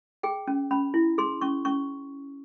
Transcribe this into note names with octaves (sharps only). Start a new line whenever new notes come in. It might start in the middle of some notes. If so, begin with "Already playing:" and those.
G#4 G5
C#4
C#4 B5
E4
G#4 C6
C#4 C#6
C#4 C#6